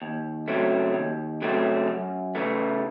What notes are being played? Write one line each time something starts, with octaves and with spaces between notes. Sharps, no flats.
D#2
C#3 F#3 A3 C4
D#2
C#3 F#3 A3 C4
F#2
C#3 E3 A3